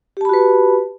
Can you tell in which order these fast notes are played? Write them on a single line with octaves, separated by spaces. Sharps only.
G4 A5 B5 F#4 B4